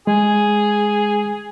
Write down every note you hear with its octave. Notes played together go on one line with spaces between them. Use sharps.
G#3 G#4